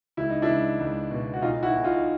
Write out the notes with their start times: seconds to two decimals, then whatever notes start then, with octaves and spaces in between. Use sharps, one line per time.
0.17 C#2 E4
0.30 D#4
0.42 D4 E4
0.49 C#2
0.79 C#2
1.11 B2
1.34 F#4
1.42 B1 D#4 F4
1.63 E4 F#4
1.74 B1
1.84 D#4 F4